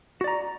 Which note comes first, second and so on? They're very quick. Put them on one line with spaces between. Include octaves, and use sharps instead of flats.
F#4 D5 A#5